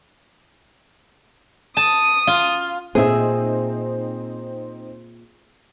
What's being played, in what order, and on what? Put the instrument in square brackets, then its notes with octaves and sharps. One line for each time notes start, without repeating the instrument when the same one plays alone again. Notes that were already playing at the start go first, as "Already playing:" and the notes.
[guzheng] A5 [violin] D#6
[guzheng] F4
[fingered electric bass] A#2 [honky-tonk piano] C4 D#4 [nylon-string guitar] G#4 E5